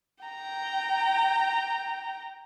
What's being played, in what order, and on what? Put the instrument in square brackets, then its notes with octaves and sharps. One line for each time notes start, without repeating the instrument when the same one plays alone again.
[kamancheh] G5 A#5